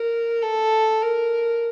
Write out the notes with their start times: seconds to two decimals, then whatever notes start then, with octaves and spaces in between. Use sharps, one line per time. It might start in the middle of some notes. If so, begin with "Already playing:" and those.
Already playing: A#4
0.42 A4
1.02 A#4